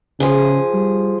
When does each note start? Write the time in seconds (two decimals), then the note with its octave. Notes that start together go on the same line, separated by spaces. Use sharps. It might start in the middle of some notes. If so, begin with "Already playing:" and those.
0.20 C#3 F3 G#4
0.74 G3